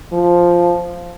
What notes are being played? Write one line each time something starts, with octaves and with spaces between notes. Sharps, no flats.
F3